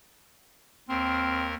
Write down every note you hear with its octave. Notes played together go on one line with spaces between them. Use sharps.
D#2 C4 A#4